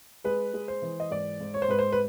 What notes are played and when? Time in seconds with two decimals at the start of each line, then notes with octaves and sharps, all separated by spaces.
0.24 G#3 B4
0.54 G#3
0.68 C5
0.82 E3
1.00 D#5
1.11 G#2 D5
1.40 G#2
1.54 C#5
1.62 C5
1.68 G#2 B4
1.79 C5
1.92 B4